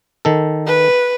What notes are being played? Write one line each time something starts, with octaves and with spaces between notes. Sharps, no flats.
D#3 A4
B4